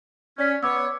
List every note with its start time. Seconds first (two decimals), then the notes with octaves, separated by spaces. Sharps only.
0.38 C#4 D5 B6
0.63 B3 C#5 D6 E6